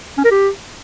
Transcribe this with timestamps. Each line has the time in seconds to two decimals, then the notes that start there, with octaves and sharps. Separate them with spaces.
0.18 C#4
0.24 A#4
0.31 G4